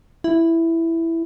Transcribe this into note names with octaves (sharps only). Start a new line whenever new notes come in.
E4